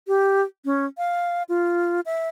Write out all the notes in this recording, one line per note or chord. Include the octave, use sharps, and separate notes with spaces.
G4
C#4
F5
F4
E5